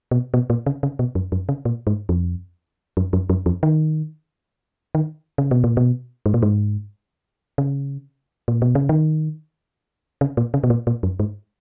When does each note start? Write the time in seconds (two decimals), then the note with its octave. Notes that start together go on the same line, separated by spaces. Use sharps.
0.11 B2
0.34 B2
0.50 A#2
0.66 C#3
0.83 C#3
0.99 B2
1.15 F#2
1.32 F#2
1.49 C#3
1.65 A#2
1.87 G#2
2.09 F2
2.97 F#2
3.13 F#2
3.30 F#2
3.46 F2
3.63 D#3
4.95 D#3
5.38 C#3
5.51 B2
5.64 A#2
5.77 B2
6.26 G#2
6.34 A#2
6.43 G#2
7.58 C#3
8.48 A#2
8.62 B2
8.75 C#3
8.89 D#3
10.21 C#3
10.37 A#2
10.54 C#3
10.64 B2
10.70 A#2
10.87 A#2
11.03 F#2
11.20 G#2